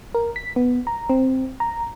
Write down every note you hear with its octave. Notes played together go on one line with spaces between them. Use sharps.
A#4
B6
B3
A#5
C4
A#5